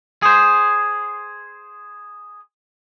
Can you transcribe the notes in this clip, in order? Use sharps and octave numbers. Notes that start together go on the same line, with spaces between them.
G#4 C5